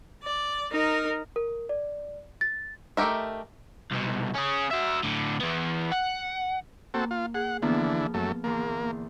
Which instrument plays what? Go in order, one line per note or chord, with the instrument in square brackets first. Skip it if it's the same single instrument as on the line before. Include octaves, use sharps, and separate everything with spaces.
[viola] D5
D#4 A#4
[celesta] A#4
D5
A6
[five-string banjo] A3 D#4 G4 A#4 E5
[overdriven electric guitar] C2 B2
C#4 G#4
F#4 E5
A2 D3
E3 B3
F#5
[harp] A#3 [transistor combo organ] C4 F#4 A4
[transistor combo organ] F4
[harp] G#4 [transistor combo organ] F#5
[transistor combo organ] D3 E3 [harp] F3 A#3 B3
[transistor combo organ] F#2 A3
[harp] E2 A#2 D3 [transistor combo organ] A#3